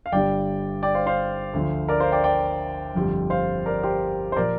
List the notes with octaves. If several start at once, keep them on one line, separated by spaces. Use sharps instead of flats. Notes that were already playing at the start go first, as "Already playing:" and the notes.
F5
G1 G2 G3 D5 G5
D5 G5
C5 F5
C5 F5
D2 D3 F3
A#4 D5
C5 F5
D5 G5
D5 G5
G1 F2 D3 G3
C5 F5
A#4 D5
G4 C5
C5
A#2 F3 A#4 D5